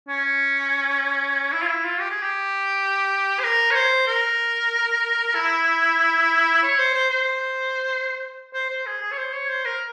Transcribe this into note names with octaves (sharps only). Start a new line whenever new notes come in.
C#4
E4
F4
E4
F4
G4
G#4
G4
C5
A#4
C#5
C5
A#4
E4
C#5
C5
C5
C5
C5
C5
G#4
G#4
C#5
C5
C#5
C5
A#4